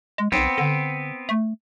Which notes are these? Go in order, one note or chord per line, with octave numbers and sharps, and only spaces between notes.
G#3
B1 B3 C4
D3
A3